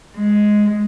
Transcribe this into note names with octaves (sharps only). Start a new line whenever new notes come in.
G#3